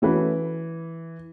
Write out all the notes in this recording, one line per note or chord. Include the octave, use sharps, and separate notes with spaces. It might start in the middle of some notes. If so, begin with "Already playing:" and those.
E3 A3 C#4 F#4 B4